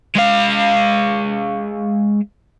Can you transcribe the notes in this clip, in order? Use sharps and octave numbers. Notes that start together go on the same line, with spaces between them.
G#3 F5